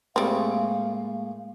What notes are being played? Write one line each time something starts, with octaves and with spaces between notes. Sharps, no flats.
A2 G3 G#3 A#3 C4 G#4 F5 C#6